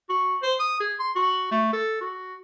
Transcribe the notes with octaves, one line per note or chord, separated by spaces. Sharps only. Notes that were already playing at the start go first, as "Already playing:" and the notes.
F#4
C5
D#6
G#4
C6
F#4
A3
A4
F#4